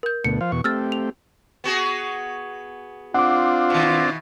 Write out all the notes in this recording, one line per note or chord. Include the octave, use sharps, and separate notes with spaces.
A#4 G6
D2 B2 A3 C#7
F3 C5 F5
E2 B2 C#6
A3 C4 G4 E6 F6 A6
F7
B3 F#4 G#4
C4 D4 F4 F#5 D6
B2 D#3